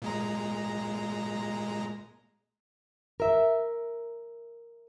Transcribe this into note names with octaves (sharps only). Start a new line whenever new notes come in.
A#2 G#3 A#5
A#4 E5